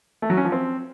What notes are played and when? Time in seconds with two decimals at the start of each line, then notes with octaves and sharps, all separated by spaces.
0.22 A3
0.30 F#3
0.37 C#4
0.45 F3
0.52 C4